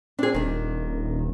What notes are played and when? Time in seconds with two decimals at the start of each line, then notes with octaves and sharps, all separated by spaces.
0.19 C4 D4 G#4
0.35 D#1 D#3 D4